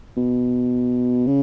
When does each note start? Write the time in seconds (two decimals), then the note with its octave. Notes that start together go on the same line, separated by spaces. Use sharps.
0.17 B2
1.26 C#3